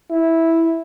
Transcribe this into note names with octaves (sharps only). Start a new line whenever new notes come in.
E4